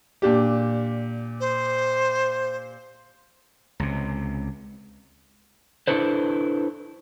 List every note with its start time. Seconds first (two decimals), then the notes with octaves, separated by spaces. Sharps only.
0.22 A#2 D4 G4
1.40 C5
3.80 C#2 C3
5.88 D4 E4 A4 B4 C5